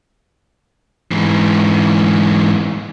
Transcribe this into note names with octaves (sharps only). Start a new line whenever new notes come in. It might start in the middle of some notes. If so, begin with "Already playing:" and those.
G#2 E3